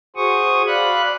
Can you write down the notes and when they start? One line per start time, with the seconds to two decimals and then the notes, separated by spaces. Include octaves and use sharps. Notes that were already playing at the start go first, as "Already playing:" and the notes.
0.16 F#4 G#4 C5 C#6 D#6
0.67 D5 F5 B5 F#6